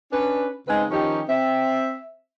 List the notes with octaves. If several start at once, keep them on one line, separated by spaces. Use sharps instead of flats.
C#4 D4 B4
C#3 G#3 C4 D#4 G#4 B4
D#3 F3 C#4 D#4 G4
C4 E5